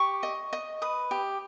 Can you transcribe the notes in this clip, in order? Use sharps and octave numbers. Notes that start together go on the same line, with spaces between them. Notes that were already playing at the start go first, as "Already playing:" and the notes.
Already playing: G4 C#6
D#5
D#5
B4 D#6
G4